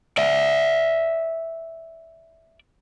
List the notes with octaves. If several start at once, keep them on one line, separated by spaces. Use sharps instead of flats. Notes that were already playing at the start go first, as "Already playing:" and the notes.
D5 E5